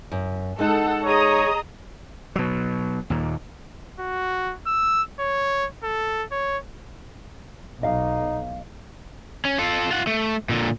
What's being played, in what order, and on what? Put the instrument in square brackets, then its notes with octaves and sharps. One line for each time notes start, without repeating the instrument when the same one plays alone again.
[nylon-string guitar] F#2
[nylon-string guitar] G#3 D#4 [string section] A4 F#5
[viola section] G#4 D#5 [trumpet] C#5 [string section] A#5 D#6
[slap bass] B2 F#3
D#2 A#2
[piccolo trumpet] F#4
E6
C#5
A4
C#5
[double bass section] B1 [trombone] D#4 [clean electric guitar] D#5 F5
[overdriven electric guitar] C#4
F4 A4
F4 F#5
A3
A#2 D3